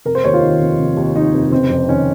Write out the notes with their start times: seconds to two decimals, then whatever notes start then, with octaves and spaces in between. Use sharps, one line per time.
0.05 F1 A#4
0.15 C5
0.24 D#2 C#5
0.34 F4
0.42 D#3
0.61 F1
0.79 F1
0.97 D#2
1.16 D#3 D#4
1.33 F1
1.52 F#1 C4
1.70 F2
1.88 D#3 C#4